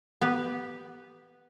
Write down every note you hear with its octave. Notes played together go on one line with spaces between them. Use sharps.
B3 G4 B4